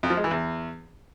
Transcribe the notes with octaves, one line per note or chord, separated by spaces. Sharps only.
F2
F3
G#3
E3
E2